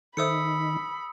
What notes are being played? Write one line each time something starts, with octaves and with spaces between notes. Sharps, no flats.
D#3 A4 C5 E5 B5 D#6 E6 C#7